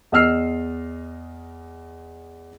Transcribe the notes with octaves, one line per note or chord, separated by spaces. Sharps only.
E2 D#5 E6 F6 C7